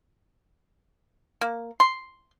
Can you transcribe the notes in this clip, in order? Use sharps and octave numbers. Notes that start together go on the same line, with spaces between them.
A#3
C6